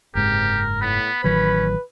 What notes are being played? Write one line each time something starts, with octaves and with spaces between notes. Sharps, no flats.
F#1 G#2 C3 G4 A#4
A2 B3 B5
A1 D#3 F#3 C#4 B4